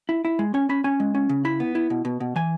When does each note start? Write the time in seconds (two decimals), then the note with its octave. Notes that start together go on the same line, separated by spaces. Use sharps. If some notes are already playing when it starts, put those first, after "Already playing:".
0.09 E4
0.25 E4
0.39 G#3
0.54 C#4 G#5
0.69 C#4 B5
0.84 C#4 G#5
1.00 G#3
1.15 C#4
1.29 C#3
1.45 E4 B5
1.60 B3
1.75 E4
1.90 B2
2.05 B2
2.20 B2
2.36 E3 G#5